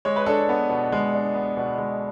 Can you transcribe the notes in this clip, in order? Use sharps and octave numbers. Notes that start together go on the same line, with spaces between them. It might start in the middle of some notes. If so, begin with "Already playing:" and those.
G#3 C#5
B4
D4 A4 C#5
B3
B2
G#3
D4
B3
B2
G#3